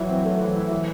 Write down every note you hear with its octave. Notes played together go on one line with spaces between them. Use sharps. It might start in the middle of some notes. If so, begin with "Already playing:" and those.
Already playing: E3 F#3 E4
C4
A3
E3
E4
E3